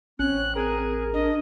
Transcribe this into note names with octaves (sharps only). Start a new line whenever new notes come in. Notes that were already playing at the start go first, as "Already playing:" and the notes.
A1 C4 C#4 F#6
G#4 A#4
D4 D#5